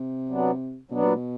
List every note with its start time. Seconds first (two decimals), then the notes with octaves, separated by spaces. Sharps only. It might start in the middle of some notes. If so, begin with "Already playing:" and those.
Already playing: C3
0.29 F#3 B3 D4
0.91 B2 F#3 B3 D4
1.04 A#2
1.16 B2